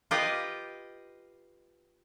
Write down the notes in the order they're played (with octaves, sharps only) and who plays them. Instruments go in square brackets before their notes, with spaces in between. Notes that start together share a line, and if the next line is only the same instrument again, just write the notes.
[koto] F4 G4 B4 D#5